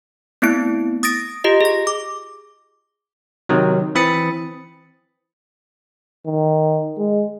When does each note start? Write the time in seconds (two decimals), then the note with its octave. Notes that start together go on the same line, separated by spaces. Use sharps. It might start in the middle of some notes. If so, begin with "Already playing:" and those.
0.42 A3 B3 C4 E4 D7
1.03 D#6 A6 A#6 D7
1.44 F4 G4 D#5
1.61 G#4 A#6
1.87 D6
3.49 C3 D#3 F#3
3.95 E3 C4 B5 D#6 A6 C#7
6.26 D#3
6.98 G#3